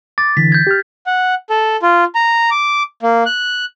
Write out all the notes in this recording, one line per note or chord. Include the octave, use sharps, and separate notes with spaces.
D6 A6
D3 E3 B6
G6 G#6
G4 F6
F#5
A4
F4
A#5
D6
A#3
F#6